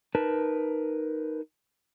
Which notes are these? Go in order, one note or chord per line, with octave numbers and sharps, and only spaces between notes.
D#4 A#4 B4 A5